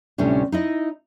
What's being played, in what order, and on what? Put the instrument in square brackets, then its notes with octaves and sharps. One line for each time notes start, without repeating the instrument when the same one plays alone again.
[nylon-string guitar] D2 A2 C3 G3 C#4 D4
D#4 E4 D#5